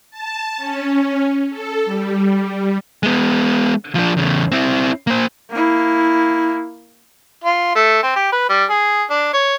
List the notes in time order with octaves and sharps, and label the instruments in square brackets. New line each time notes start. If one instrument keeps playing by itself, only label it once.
[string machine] A5
C#4
A4
G3
[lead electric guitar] G#3 B3
F3 D4
E2 C#3
C4 E4
A#3 C5
[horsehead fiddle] A#3 E4
[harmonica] F4
A3
C4
G4
B4
G3
G#4
D4
C#5